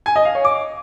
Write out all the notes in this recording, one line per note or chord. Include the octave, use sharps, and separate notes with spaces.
G#5
D#5
F5
C#5
D6